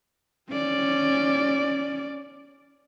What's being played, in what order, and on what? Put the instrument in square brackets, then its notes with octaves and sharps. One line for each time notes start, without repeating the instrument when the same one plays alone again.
[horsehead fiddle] C#4 D5